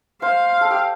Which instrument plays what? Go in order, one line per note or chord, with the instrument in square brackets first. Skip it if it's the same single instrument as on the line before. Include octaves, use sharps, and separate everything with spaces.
[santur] C5 [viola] F5
[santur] A4
G4